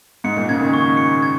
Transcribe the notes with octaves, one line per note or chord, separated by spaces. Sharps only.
G#2 C#7
A#2
C#3 G#6
D#3
C#6
C#7
G#6